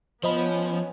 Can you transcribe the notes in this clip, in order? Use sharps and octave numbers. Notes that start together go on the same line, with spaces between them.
F3 B3 C#4 C5 D#5 B5